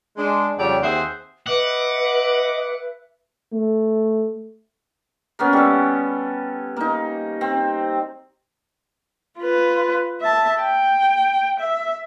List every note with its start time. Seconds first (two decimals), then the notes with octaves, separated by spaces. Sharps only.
0.16 G#3 D4
0.58 F2 C#3 F#3 G3 C#5 D5
0.82 D#2 C4 G#4 C5 E5 F#5
1.46 B4 D#5 E5 F#5 D6
3.53 A3
5.39 A#3 B3 C#4
5.53 G3 A4
6.76 A#3 D#4
7.41 C4
9.39 F4 B4
10.21 E5 A5
10.61 G5
11.60 E5